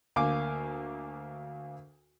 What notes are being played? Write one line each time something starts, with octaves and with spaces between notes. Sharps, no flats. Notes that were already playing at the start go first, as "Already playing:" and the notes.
D2 A#3 F5 G#5 D6